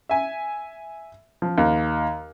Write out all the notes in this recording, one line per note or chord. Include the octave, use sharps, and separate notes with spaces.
E5 G#5
F3
D#2